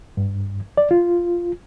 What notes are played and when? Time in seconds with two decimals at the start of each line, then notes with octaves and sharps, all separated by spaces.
0.17 G2
0.77 D5
0.91 F4